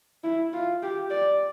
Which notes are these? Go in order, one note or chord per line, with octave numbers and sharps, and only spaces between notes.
E4
F4
G4
D5